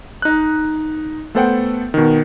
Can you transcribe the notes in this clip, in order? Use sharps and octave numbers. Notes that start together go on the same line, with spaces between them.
D#4 F#6
A3 B3 A4 C5 F#5 G5
B2 D#3